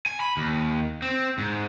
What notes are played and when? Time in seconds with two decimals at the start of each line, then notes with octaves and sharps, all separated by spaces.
0.06 G#5
0.20 B5
0.37 D#2
1.02 C4
1.38 G#2